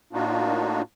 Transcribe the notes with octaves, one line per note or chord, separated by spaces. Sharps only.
A2 A#3 D4 D#4 F4 F#4